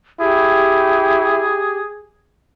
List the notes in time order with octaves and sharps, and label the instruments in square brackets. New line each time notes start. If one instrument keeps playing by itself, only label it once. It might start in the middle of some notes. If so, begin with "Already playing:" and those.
[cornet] E4 [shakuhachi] G4 [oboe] G#4